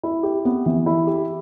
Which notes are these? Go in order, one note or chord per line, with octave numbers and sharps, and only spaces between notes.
E4
G4
B3
E3
E4
G4